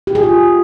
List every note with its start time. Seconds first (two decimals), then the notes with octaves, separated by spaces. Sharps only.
0.07 G4
0.15 G#4
0.23 F4